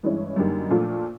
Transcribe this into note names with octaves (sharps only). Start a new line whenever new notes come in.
G2 E3 G#3 C#4 E4
F#2 D3 G3 A#3 D#4
A#2 F3 A3 D4 F4